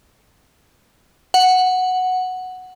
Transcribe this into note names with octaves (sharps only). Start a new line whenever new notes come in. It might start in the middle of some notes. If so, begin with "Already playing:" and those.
F#5